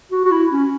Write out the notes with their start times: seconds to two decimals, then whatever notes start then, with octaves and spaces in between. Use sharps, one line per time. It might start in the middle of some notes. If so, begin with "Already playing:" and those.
0.12 F#4
0.25 F#4
0.31 E4
0.51 C#4